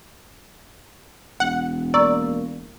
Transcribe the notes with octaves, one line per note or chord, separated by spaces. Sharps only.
E1 F#5
A#3 D5 A#5 C#6 E6